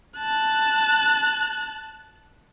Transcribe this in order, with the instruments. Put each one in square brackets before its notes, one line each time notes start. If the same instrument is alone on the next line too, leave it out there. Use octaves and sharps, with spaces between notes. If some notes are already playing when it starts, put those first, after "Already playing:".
[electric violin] A5 F#6